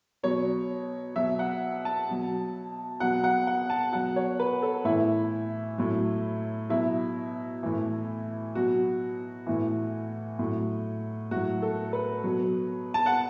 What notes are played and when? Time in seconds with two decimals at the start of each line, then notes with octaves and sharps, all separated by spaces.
0.23 B2 F#3 C#5
1.15 B2 F#3 E5
1.39 F#5
1.85 A5
2.09 B2 F#3
3.00 B2 F#3 F#5
3.24 F#5
3.47 F#5
3.70 A5
3.92 B2 F#3 F#5
4.16 C#5
4.40 B4
4.62 A4
4.85 A2 E3 E4
5.78 A2 F#3
6.69 B2 F#3 E4
7.63 A2 E3
8.55 B2 F#3 F#4
9.47 A2 E3
10.39 A2 F#3
11.31 A2 F#3 F#4
11.62 A4
11.93 B4
12.24 B2 F#3
12.94 A5
13.06 F#5